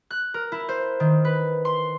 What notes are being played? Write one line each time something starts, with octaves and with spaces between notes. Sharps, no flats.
F#6
A#4
E4
C5
D#3
B4
C6